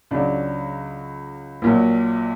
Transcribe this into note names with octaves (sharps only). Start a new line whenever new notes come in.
C#2 C#3 F#3 D4
A#1 A#2 F#3